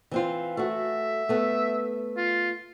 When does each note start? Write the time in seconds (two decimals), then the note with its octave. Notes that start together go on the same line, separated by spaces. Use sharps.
0.11 E3 C4 F4
0.57 A3 F#4 E5
1.29 A3 B3
2.17 F4